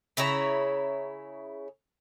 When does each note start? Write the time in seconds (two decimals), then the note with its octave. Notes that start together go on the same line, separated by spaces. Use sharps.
0.17 C#3 E4 C#5 A#5